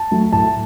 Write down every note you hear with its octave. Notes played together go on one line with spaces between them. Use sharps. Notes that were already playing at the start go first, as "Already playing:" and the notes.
Already playing: A5
F#3 A3
A2 A5